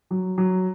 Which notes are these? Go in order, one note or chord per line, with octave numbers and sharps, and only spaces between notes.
F#3
F#3